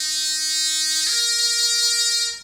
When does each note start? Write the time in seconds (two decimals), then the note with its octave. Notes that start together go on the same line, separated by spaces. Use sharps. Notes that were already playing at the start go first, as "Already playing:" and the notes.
Already playing: D#4
1.07 A#4